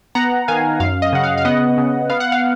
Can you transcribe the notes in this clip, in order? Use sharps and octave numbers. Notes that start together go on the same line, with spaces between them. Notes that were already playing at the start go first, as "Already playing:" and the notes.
B3 F#5 A#5
D#3 F5 G#5
F#2 F5
D#5
C#3 F#5
F5
F5
B3 D#5 F#5
C#3
B3 F5
F#5
F5